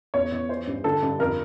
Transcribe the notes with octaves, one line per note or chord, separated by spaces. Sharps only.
E2 C#5
E2
E3 C5
G2
D3 A4
G2
F2 A#4